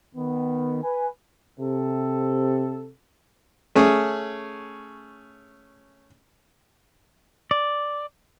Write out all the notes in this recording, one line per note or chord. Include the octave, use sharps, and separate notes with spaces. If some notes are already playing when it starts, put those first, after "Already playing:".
D#3 B3
B4 G#5
C3 A4
A3 C#4 G#4
D5